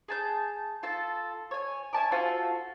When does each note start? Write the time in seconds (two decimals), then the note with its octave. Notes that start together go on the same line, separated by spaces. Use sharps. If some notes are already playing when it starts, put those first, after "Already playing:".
0.08 G#4 A5 G6
0.83 F4 A4 A5
1.51 C#5 G#5
1.93 E5 G#5 A5 D6
2.12 F4 F#4 A4 C5